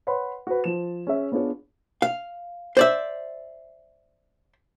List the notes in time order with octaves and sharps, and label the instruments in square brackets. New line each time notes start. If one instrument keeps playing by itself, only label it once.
[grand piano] B4 C#5 F#5 B5 C6
F#4 B4
F3 E7
C#4 G#4 E5
B3 D4 F4 G#4 C#5
[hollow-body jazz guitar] F5
C5 D5 E5